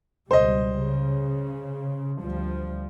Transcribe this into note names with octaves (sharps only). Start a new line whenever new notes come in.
C#2 B2 G3 C5 D#5
C#3
D2 F3 G3